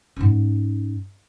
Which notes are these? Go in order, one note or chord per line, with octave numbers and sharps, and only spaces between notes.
G#2 C#4